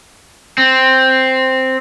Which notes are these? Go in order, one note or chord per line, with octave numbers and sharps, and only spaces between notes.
C4